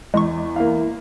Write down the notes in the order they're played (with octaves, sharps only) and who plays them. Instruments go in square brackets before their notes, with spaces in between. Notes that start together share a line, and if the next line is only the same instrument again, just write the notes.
[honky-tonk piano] E2 [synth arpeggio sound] G#3 C#6
[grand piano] A#3 F5 [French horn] E4